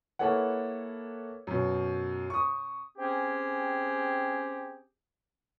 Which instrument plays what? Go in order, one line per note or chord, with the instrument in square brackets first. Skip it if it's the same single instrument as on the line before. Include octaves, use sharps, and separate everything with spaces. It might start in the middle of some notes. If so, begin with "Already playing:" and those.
[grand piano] A#3 E4 A4 B4 C#5 F#5
F#2 B2
C#6 D#6
[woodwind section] C4 C#4 G4 G#4